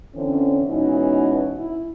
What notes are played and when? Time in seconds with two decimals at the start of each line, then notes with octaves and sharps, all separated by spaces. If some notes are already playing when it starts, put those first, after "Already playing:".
0.13 D3 E3 C4 C#4
0.68 G#2 B2 E3 C#4 D#4
1.57 E4